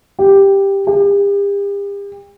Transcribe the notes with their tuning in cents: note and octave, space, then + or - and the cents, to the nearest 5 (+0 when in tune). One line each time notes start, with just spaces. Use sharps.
G4 +5
G4 +40